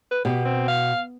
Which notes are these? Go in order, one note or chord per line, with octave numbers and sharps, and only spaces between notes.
B4
B2 G4
C4
F5